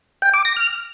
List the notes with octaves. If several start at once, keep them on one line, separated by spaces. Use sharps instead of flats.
G5
D6
A#6
F6